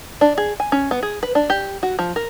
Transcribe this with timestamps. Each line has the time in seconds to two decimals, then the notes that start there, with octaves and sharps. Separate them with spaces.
0.21 D4
0.38 G#4
0.60 G#5
0.72 C#4
0.91 B3
1.03 G#4
1.23 B4
1.35 D4
1.50 G4
1.83 F#4
1.99 F3
2.16 A#4